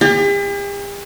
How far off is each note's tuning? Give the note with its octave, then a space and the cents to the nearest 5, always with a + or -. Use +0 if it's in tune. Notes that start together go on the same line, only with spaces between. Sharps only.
G4 +45